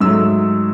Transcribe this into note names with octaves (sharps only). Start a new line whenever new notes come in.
G#2 F#3 A3 E6